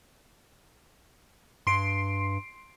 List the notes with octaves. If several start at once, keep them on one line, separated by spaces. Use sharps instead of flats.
G2 C6 C7 D7